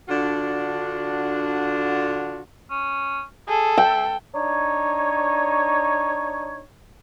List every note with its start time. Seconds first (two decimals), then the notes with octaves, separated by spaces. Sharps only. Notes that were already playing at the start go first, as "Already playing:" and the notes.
0.09 D3 D4 F4 F#4
2.70 C#4
3.48 G#4 A4
3.78 E5 G5
4.34 D4 D#4 C#5